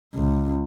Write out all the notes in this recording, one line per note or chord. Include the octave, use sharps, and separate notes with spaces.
C#2